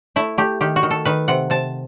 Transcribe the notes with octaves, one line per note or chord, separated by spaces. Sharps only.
A3 E4
A3 G4
D#3 G4
F#4
D#3
A4
D#3 B4
C3 F#5
C3 A5